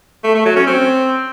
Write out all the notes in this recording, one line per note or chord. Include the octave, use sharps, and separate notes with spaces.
A3
A3
F#3
C#4
C4